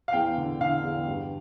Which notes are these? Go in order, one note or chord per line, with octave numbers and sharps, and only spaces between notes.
F5
E2 G5
D3
D3 F5
E2
G2